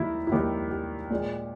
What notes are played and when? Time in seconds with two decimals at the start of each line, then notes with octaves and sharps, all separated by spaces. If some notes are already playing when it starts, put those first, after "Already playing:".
Already playing: D#2 D#3 G3 E4
0.27 E4
0.32 D#2 D#3 G3 G4
0.71 G4
1.10 A#2 G#3